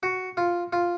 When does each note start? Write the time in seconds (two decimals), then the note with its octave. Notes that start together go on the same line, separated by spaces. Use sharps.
0.03 F#4
0.37 F4
0.73 F4